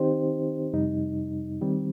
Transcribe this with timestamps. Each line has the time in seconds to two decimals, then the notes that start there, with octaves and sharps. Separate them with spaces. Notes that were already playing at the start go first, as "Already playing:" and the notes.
Already playing: D#3 C4 D#4 G4 C5
0.73 F2 C3 G3 D#4
1.61 D#3 G3 C4